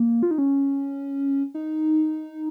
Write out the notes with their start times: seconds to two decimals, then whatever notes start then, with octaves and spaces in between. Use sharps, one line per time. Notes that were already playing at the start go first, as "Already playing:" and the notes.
Already playing: A#3
0.23 F4
0.31 D#4
0.38 C#4
1.54 D#4